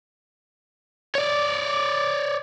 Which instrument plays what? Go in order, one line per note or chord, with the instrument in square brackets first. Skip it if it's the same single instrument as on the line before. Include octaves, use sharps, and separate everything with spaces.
[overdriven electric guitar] C#5 D5